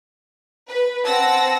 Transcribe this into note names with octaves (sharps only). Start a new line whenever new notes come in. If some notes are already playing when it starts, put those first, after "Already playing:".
B4
C4 F#5 A5 E6 A#6